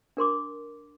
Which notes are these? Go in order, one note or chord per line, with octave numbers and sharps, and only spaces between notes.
D4 A#4 C6 D6